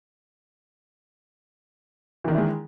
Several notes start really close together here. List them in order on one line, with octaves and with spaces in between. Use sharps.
E3 D#3 D4 E4 G#3